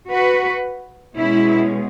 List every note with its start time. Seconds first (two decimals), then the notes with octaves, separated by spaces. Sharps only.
0.09 F#4 B4
1.17 B2 G#3 C#4 E4